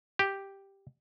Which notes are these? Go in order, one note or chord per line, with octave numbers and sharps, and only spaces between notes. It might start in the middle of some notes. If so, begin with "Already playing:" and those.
G4